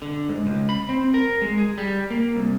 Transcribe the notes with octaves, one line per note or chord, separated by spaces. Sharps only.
D3
G#2
C#2
B5
C4
A#4
G#3
G#4
G3
A#3
C2